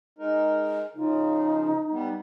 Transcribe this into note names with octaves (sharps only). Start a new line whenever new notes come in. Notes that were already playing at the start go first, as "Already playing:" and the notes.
G#3 D#4 A#4
C#3 F3 D#4
G3 B3